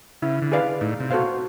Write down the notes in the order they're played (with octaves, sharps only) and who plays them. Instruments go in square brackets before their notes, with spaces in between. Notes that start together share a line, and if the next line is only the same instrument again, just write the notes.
[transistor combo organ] C#3 [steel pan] E4
[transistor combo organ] D3
[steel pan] G#4 B4 D5 F5
[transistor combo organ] A2 [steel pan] D#4
[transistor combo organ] C3
[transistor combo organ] B2 [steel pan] F#4 A4 C5 F5